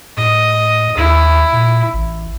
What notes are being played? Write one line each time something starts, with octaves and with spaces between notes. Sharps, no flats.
A2 D#5
D#2 E4
A#2
A1